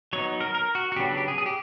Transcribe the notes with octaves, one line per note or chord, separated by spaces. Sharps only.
F#3 B3 D#4 C#5
A#4
A#4
F#4
F#4
C#3 F#3 B3 D4 G4
G4
G#4
G#4
G4